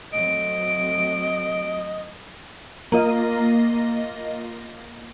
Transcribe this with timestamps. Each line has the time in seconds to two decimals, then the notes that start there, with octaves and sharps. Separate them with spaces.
0.13 F#3 A3 C4 D#5 D7
2.92 A#3 F4 D#5